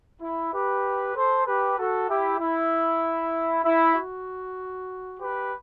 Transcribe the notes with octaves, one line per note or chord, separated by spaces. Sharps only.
E4
G4 B4
A4 C5
G4 B4
F#4 A4
E4 G4
E4
E4
F#4
G4 B4